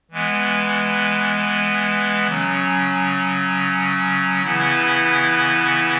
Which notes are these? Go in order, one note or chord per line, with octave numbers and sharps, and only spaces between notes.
E3 G#3 B3
C#3 F#3 C#4
C#3 E3 B3 E4